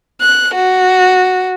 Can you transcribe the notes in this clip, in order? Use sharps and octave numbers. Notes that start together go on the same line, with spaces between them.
F#6
F#4